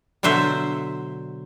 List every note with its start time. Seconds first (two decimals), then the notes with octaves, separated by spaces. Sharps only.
0.23 B2 D3 F#3 C5 E5